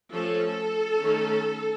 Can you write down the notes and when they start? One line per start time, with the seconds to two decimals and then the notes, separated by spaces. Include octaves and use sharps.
0.12 F3 A3 C#4 A4
1.00 D#3 A3 C#4